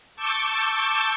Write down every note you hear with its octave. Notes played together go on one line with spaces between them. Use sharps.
A5 C#6 D6 E6 G6